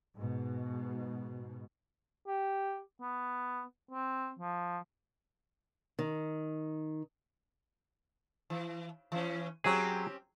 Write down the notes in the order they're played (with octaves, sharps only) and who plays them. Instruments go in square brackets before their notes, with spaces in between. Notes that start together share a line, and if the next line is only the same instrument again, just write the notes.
[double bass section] G#2 B2
[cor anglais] G4
B3
C4
F3
[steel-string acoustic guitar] D#3
[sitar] E3
E3 C#4
[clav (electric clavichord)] F#3 G#4 [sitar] C4 C#4 G4